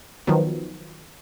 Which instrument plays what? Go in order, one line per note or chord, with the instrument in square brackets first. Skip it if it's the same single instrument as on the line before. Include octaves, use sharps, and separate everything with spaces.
[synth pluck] D#3 F3 F#3 B3